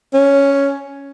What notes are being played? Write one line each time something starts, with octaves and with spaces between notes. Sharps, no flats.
C#4